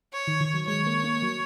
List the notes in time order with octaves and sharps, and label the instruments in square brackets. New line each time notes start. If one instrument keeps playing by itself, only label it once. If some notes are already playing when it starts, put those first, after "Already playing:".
[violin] C#5
[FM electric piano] D#3
D#3
F#3
[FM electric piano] G#3 [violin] C#5
[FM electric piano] A#3
A#3
F#3